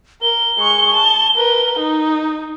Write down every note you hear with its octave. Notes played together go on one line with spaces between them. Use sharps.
A#4 G7
G#3 C#6
A5
A#4 B4
D#4